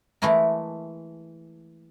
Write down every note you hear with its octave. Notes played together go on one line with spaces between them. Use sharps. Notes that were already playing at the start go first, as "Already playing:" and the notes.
E3 G#3 A3 E4 A#4